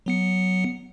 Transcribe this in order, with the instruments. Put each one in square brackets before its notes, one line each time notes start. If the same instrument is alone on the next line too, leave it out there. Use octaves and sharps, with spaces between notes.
[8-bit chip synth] F#3 B3 C#7